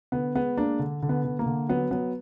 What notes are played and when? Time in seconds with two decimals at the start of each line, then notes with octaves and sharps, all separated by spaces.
0.12 D3 B3
0.35 G#3 B3
0.57 G#3 A#3 D4
0.79 D3
1.02 D3
1.09 B3
1.25 D3
1.39 A#3
1.46 D3
1.69 F#3 B3
1.91 F#3 B3